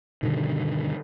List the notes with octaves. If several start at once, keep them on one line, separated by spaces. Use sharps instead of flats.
G2 B2 D3 D#3